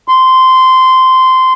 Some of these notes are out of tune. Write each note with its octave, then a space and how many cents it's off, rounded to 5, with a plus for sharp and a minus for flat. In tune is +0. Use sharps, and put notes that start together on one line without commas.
C6 -15